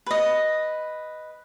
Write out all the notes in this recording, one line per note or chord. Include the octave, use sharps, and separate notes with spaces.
B4 D#5